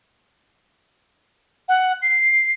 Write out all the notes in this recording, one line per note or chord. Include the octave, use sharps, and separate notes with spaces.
F#5
C7